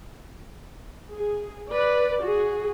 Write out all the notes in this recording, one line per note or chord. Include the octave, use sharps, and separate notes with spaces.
G#4
B4 D5
F#4 G#4